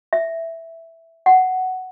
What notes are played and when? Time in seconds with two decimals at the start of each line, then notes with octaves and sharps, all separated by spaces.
0.13 E5
1.26 F#5